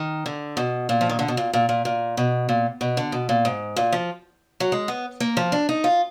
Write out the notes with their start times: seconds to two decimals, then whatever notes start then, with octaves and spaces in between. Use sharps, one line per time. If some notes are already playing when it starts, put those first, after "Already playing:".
Already playing: D#3
0.26 D3
0.57 B2
0.89 A#2
1.01 F3
1.10 D#3
1.19 D3
1.28 B2
1.37 A#2
1.53 A#2
1.69 A#2
1.85 A#2
2.17 B2
2.49 A#2
2.81 B2
2.97 D3
3.12 B2
3.29 A#2
3.45 G#2
3.76 A#2
3.92 F3
4.60 F#3
4.72 G#3
4.88 B3
5.20 A#3
5.37 F3
5.52 D4
5.69 D#4
5.84 F4